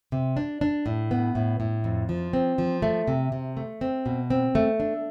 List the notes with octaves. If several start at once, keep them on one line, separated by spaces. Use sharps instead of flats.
C3
D4
D4
A2
B3
A2
A2
F2
F3
C4
F3
A3
C3
C3
A3
C4
B2
C4
A3
D4